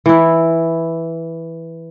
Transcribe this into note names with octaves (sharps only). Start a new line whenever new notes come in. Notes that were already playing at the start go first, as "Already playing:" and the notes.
E3 E4